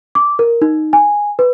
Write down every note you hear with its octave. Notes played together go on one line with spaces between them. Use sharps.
D6
A#4
D#4
G#5
B4